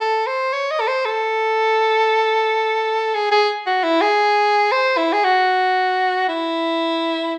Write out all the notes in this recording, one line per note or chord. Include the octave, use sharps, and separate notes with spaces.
A4
C5
C#5
D#5
A4
C5
A4
G#4
G#4
F#4
E4
G#4
C5
E4
G#4
F#4
E4